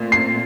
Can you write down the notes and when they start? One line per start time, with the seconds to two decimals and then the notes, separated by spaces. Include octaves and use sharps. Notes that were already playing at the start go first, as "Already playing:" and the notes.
Already playing: A#2 A3 C4 F4
0.12 C7